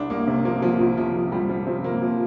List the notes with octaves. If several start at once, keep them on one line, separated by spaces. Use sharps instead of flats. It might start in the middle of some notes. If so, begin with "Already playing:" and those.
Already playing: C2 D4
C2 A#3
C3
F3 A#3
C2 F3
C2
C3 F3
F3
C2 G3
C2 F3
C3 C4
F3 A#3
F3